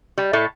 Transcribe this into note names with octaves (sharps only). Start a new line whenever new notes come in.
G3
A2 A3